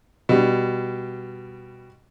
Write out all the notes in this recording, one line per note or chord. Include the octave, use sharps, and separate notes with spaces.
B2 G3